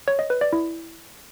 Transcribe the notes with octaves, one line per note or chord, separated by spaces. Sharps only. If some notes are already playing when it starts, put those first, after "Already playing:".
C#5
D#5
B4
D5
E4